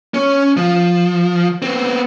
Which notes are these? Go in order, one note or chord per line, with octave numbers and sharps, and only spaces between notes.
C#4 C#5
F3
B3 C4